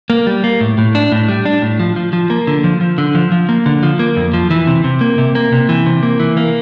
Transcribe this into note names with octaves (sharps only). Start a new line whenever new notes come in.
A#3
G3
A#3
A2
A2
D4
A2
G3
D4
A2
F3
F3
F3
A#3
D3
F3
F3
D3
F3
F3
A#3
D3
F3
A#3
F2
F3
E3
C3
C3
A#3
C3
A#3
C3
E3
C3
A#3
E3
A#3